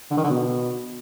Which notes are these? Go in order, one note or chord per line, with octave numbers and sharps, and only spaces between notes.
D3
D#3
D3
B2